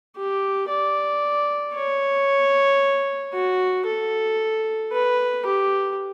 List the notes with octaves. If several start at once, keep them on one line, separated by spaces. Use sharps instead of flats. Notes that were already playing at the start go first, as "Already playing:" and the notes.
G4
D5
C#5
F#4
A4
B4
G4